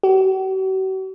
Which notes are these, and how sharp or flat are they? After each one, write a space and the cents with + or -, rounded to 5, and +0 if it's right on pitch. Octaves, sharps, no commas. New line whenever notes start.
F#4 +45